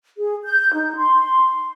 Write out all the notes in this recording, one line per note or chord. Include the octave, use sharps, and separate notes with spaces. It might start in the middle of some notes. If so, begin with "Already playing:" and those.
G#4
G6
D#4
C6